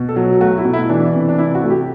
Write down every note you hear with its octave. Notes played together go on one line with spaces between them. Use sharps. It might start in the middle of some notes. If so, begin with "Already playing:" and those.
Already playing: B2
A4
F#3
A3 F#4
E4
B2
E4
E3 D4
C3
D4
C3 E4
F#4
A3
G4